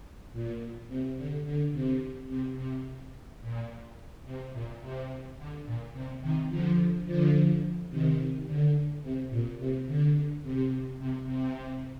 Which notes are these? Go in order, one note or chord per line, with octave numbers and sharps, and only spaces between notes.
A#2
C3
D3
D3
C3
C3
C3
A#2
C3
A#2
C3
D3
A#2
C3
C3 D#3
D3 F3
D3 F3
C3 D#3
D3
C3
A#2
C3
D3
C3
C3
C3